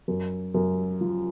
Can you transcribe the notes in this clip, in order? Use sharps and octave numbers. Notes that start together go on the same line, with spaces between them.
F#2
F#2
F3